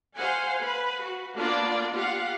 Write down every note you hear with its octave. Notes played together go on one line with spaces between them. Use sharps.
C5 F5 F#5 G#5
B4
F#4
A#3 B3 D4 F4 D5
F4 G4 F5 F#5